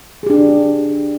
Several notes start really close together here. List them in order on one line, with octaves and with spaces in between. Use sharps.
G#4 G4 D4